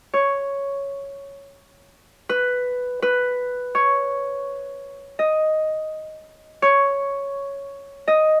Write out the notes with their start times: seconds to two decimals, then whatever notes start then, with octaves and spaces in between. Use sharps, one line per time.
0.14 C#5
2.29 B4
3.02 B4
3.75 C#5
5.19 D#5
6.62 C#5
8.08 D#5